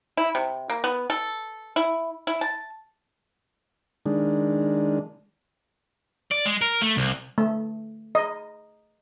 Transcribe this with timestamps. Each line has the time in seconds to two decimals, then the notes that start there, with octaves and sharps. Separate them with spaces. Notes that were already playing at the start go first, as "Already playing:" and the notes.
0.17 E4
0.35 C3
0.70 A#3
0.84 B3
1.10 A4
1.76 E4
2.27 E4
2.41 A5
4.06 D#3 G#3 D4
6.31 D5
6.45 G#3
6.61 A#4
6.82 A3
6.97 C2
7.38 A3
8.15 D#5